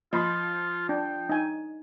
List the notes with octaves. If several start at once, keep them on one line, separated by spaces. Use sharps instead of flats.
F3 F4 D#5 B5 C6
D4 G5
D#4 G#5